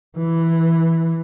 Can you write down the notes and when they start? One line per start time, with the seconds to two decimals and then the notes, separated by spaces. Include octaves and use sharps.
0.18 E3